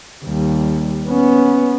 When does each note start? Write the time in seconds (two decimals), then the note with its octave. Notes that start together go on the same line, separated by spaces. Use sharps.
0.24 D#2 G3
1.09 B3 C#4